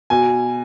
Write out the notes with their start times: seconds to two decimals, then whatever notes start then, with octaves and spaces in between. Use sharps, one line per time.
0.10 B2 G#5